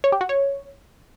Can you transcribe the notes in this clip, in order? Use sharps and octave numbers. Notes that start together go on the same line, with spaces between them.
C#5
G4
F#4
C#5